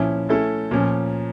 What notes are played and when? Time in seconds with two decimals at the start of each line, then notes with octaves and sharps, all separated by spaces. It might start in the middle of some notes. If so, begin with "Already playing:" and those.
Already playing: A#2 F3 C#4 E4
0.29 A3 C#4 E4 A4
0.71 A#2 F3 C#4